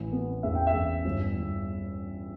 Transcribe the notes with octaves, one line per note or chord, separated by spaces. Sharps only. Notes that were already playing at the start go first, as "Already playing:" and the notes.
Already playing: A1 E3
B3
E2 E5
G5
E5
E2
G1
G1